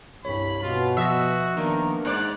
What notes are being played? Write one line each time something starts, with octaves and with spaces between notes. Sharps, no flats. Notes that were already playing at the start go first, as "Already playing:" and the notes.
C2 G2 C#5 B5
B2 F4
F3 F#4 E5 D#6 A#6
D#3 A#3 B3 D4 A#4
G#2 D#4 C5 D5 F#6